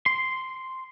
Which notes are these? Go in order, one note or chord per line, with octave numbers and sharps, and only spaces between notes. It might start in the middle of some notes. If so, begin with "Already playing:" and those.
C6